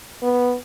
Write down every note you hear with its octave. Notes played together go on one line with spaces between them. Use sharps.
B3